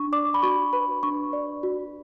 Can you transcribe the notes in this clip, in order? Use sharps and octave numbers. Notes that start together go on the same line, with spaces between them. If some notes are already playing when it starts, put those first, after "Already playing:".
Already playing: D4 C#6
D5 D6
B5
F#4 C#6
B4 B5
D4 C#6
D5
F#4